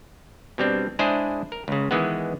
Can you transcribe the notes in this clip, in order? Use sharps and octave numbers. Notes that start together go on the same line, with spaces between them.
B2 G3 C4 D4
G#3 D4 E4 G#4 C5
A#4
C#2 C#3
D#3 E3 G#3 B3